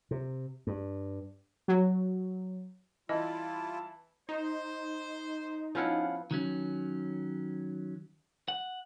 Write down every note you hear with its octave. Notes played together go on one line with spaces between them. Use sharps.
C3
G2
F#3
E3 G3 E4 F4 D#5 A5
D#4 C5
F3 B3 C#4 E4 F5 F#5
D#3 F#3 C#4
F#5